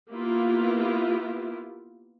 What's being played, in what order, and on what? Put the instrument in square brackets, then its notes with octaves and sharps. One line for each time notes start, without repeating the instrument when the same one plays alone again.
[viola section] A#3 B3 E4 F4 G4